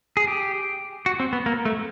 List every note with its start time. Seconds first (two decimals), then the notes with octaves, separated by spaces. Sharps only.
0.17 G#4
0.27 G4
1.06 F#4
1.20 C4
1.33 B3
1.46 A#3
1.65 A3